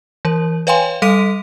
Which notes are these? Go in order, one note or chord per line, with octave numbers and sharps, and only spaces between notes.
E3 A#4
B4 C#5 F5 G5 G#5 C6
G3 A4 F5 D6 B6 D#7